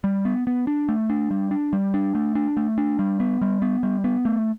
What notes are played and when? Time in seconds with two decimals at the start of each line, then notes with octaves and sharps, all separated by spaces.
0.04 G3
0.25 B3
0.47 B3
0.67 D4
0.89 A3
1.10 D4
1.31 G3
1.51 D4
1.73 G3
1.94 D4
2.15 A3
2.35 D4
2.57 A3
2.78 D4
2.99 G3
3.20 B3
3.42 G3
3.62 B3
3.83 G3
4.04 B3
4.25 A3